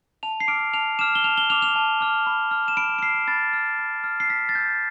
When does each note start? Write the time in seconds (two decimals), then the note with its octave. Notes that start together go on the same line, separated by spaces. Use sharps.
0.23 A5 F7
0.40 C7
0.48 D6 F6 D7
0.74 A5 F7
0.99 D6 F6 E7
1.15 G7
1.24 A5 F7
1.37 G7
1.50 D6 F6 F7
1.62 F7
1.76 A5
2.01 D6 F6
2.27 B5
2.51 F6
2.68 E7
2.77 B5 D7
2.99 D7
3.02 F6 C7
3.28 B5 A6
3.53 F6
3.79 B5
4.04 F6
4.20 C7
4.29 A5 B6
4.49 A6
4.55 E6 G6